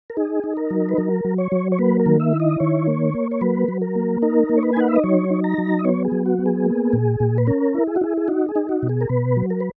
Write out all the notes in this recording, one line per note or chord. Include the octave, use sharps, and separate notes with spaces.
A#4
D#4 G#4
D#4
A#4
F#3
B4
F#3 A#4
F#3
C#5
F#3
C#5
A#3 B4
A#4
D#3
E5
E4
D#5
D#3 C#5
A#3
A#3
C#5
F#3 B4
F#3
A#4
A#3
D#4 A#4
A#3
C#5
B4
G#5
D#4 F#5
E5
D#5
F#3 C#5
D#4
A#5
F#3
D#5
B3 C#5
G#4
F#3
F#4
B3
G#4
A#3
A#2
A#2
B4
C#4 A#4
E4
G#4
F#4
E4 G#4
G#4
D#4 F#4
G#4
D#4
F#4
B2
G#4
A#4
B2 B4
F#3
A#4
B4